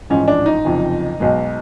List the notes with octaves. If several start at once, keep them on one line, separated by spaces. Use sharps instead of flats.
A1 G#2 F3 G#3 C#4
D4
D#4
F#1 F2 C3 F3
B1 B2 G#3